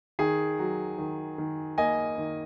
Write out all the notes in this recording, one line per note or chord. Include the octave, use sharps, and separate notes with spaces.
D#3 G#4
F#3
D#3
D#3
A#3 D#5 G#5
D#3